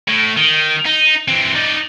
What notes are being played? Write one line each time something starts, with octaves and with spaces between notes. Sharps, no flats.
A2
D#3
D#4
E3 C4
D#4 D5